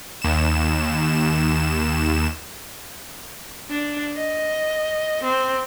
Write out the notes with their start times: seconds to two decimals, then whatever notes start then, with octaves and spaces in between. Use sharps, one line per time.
0.22 D#2 E7
3.70 D4
4.16 D#5
5.23 C4